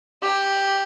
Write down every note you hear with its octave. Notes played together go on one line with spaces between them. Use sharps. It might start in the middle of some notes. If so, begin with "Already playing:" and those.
G4